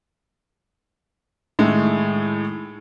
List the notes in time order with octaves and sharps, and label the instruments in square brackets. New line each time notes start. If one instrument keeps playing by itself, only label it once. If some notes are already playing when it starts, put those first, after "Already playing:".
[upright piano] A2 D#3 G#3 A3